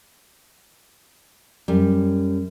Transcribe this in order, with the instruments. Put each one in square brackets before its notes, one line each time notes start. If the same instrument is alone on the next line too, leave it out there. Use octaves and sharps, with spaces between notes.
[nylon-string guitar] F#2 G3